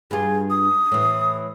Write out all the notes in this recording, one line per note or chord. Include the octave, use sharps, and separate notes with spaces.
G2 F4 G#4
D#6
A2 E3